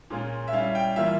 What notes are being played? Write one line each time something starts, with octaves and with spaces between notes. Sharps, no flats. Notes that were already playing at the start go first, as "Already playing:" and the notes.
A#2 G#3 C#4 F4
E5
G3 C#4 E4 F5
G5
E3 G3 A#3 F4 E5